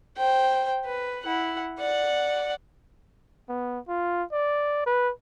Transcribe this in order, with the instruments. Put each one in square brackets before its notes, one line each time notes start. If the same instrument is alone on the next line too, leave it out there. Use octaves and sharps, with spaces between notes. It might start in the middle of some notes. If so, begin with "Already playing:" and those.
[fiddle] C5 G5
B4
E4 F#5
D5 F#5
[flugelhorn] B3
F4
D5
B4